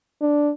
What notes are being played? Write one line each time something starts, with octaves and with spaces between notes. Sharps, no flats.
D4